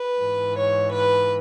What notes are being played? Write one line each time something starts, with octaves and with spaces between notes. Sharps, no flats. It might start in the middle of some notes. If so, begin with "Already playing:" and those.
Already playing: B4
G#2 E3
C#5
B4